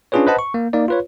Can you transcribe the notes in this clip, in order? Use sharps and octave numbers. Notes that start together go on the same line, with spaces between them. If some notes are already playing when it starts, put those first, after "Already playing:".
C#4 D4 F4 G#4 B4 C#5
B4 C5 D#5 F#5 A5 B5
C#6
A#3
A#3 D#4 D5
F4 B4 C#5